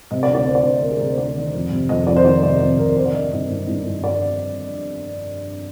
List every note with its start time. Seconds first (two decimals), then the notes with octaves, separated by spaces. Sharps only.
0.11 C3 D#5
0.23 D5
0.29 D2
0.35 D5
0.46 D2 C5
0.55 D5
0.63 D2 C5
0.82 D2 A#4
0.91 G#4
1.00 C3 A#4
1.09 C5
1.18 D2 D5
1.36 D#3
1.53 F2
1.71 C3
1.89 F2 D#5
2.07 F2 D5
2.16 C5
2.25 D#3 D5
2.43 C3 D5
2.61 F2 C5
2.78 C3 A#4
2.96 D3 C5
3.06 D5
3.14 D3 D#5
3.32 G2 D#5
3.50 G2
3.67 G2
3.86 G2
4.04 D5